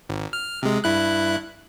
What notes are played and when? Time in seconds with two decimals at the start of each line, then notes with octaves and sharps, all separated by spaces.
0.09 G#1
0.33 F6
0.63 C3 G#3
0.84 G2 E4 F#6